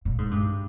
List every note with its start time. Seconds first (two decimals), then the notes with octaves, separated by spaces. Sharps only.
0.05 A#2
0.18 G#2
0.31 G2